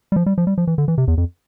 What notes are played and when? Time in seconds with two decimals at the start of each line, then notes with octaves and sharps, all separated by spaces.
0.12 G3
0.16 F3
0.26 G3
0.38 F3
0.47 G3
0.58 F3
0.67 E3
0.78 D3
0.88 E3
0.98 C3
1.08 E2
1.17 F2